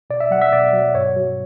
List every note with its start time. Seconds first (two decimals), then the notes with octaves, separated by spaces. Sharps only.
0.10 B2 D5
0.20 E5
0.31 F#3 F#5
0.42 E5
0.53 B2 D5
0.73 F#3
0.95 G2 C#5
1.16 F#3